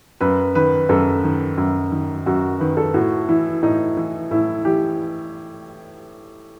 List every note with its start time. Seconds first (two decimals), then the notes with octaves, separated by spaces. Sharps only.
0.21 F#2 B4
0.55 D#3 B4
0.89 F#2 A4
1.24 D#3
1.58 F#2
1.92 D#3
2.26 F#2 F#4
2.60 D#3 B4
2.77 A4
2.94 A2 F#4
3.29 E3 E4
3.62 A2 D#4
3.97 E3
4.31 A2 E4
4.65 E3 G4